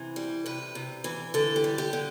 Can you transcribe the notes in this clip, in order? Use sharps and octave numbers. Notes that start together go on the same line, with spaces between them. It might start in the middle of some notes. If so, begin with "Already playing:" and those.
Already playing: C3 E3
G3
C3 B4
C3
E3
D3 A4
G4
G3
G4
D3